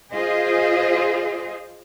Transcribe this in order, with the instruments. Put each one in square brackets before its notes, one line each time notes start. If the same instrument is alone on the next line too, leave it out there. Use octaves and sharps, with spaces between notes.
[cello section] F4 G#4 C5 D#5